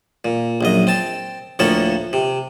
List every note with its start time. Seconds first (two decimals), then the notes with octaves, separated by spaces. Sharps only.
0.25 A#2
0.61 A#1 F#2 D#5
0.87 C4 A5
1.59 D2 A2 F3 A#3 A4 C#5
2.13 C3